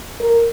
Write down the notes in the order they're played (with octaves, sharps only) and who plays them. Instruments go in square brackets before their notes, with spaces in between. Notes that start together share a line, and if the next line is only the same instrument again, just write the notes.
[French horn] A#4